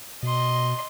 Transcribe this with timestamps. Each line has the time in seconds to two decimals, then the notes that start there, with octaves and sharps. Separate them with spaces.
0.23 B2 D#5 C6